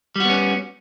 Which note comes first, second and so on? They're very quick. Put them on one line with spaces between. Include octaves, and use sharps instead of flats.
G3 F#4 B3 C#4